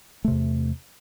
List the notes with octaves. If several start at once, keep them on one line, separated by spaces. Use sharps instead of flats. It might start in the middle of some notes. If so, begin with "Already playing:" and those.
E2 C3 A3